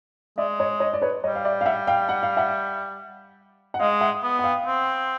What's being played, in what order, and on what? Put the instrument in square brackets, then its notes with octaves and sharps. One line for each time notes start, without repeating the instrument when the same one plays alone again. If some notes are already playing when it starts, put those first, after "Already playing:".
[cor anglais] G#3 [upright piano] D5 E5
[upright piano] C#5 D#5
C#5 D#5
D5
B4 C#5
[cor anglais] G3 [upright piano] C#5 D#5
[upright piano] F5
D5 E5
F5
E5 F#5
F5 G5
F#5
F5
E5 F#5
F#5
[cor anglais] G#3 [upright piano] D#5 F5
[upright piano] E5 F#5
[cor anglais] B3
[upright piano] F#5
F5 G5
[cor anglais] C4